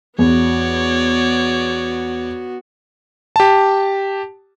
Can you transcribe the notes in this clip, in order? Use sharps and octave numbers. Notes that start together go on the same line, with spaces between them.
E2 B3 F#4 C#5 D5
G4 A5